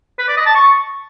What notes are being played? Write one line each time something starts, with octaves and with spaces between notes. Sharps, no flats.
B4
D5
D#5
A5
C#6